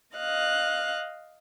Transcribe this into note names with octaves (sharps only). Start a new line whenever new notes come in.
D#5 F5 F#6